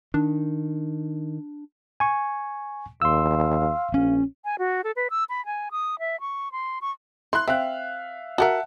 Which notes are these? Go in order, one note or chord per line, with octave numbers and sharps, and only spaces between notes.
D#3 D4
G#5 C#6
D#2 F5 C6 E6
A#1 C#4
G#5
F#4
A4
B4
E6
B5
G#5
D#6
E5
C#6
C6
C#6
E4 C6 F#6
C4 E5 F5 F#6
F#4 G4 A#4 E5 F#5 A5